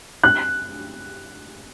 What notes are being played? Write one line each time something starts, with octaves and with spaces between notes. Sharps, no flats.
F#6